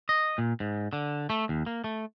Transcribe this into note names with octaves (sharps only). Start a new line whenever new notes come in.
D#5
A#2
G#2
D3
A3
D#2
A#3
A3